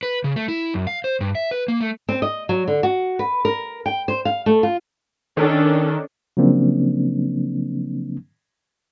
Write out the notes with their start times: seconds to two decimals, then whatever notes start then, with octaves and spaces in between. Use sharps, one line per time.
0.03 B4
0.24 C#3
0.36 A3
0.48 E4
0.74 F#2
0.87 F5
1.04 C5
1.21 G2
1.35 E5
1.51 B4
1.68 A#3
1.81 A3
2.09 C4
2.22 D#5
2.49 F#3
2.67 D3
2.83 F#4
3.19 B4
3.45 A#4
3.86 G5
4.08 C5
4.25 F5
4.46 A3
4.63 F4
5.37 D#3 C#4 D4 A4
6.37 C#3 F3 F#3 A#3 C4 D4